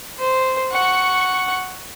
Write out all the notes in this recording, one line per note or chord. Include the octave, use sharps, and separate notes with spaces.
C5
F#5 C#6